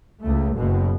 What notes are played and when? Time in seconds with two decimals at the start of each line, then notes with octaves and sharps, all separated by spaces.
0.23 C#2 A3
0.57 F#1 B2